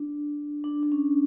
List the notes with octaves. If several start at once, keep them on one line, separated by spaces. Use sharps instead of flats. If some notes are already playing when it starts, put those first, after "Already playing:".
Already playing: D4
D4
D4
C#4